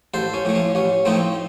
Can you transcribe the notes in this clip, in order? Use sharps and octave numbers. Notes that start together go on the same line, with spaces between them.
A1 A4 C5
C#4
A2 F3 A3
C#4
A1 C#4
A2 F3 A3 C4 D#4